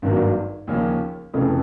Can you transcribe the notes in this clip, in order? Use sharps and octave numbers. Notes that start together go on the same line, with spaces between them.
G#1 G2 D#3 F#3 A#3
D#2 C#3 F3 A#3 C#4
F1 F2 C#3 E3 A3